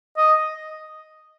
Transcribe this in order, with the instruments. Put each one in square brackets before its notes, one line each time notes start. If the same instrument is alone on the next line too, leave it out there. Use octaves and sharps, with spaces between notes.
[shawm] D#5